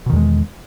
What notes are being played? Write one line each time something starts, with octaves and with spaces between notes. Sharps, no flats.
E2 B2 D#3 G#3